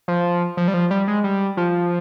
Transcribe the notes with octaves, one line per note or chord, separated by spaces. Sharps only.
F3
F3
G3
F3
G3
G#3
G3
F3